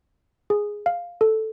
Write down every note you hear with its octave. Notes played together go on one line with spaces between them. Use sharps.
G#4
F5
A4